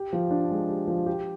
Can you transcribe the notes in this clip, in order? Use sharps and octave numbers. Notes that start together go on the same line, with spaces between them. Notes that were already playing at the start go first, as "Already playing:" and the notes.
Already playing: G4
F3
D4
G#3
G4
F3
G4